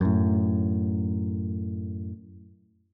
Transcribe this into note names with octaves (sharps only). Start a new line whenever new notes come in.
F#2 A2